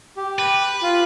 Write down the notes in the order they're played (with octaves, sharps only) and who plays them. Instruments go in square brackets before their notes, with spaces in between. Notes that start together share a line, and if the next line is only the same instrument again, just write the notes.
[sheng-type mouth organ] G4
[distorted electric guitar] B4
[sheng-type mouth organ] F4